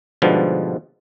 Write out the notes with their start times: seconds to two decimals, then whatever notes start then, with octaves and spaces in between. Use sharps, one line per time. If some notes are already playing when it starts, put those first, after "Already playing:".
0.22 G#2 B2 D3 F3 G3